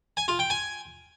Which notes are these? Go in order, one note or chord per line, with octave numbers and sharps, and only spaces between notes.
G#5
F4
G5
G#5